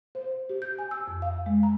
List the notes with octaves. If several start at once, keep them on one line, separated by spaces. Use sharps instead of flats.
C5
G4
G6
G#5
E6
F2
F5
G#3
A#5